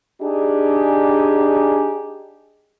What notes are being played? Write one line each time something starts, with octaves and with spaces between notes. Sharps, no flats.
D4 D#4 G4 G#4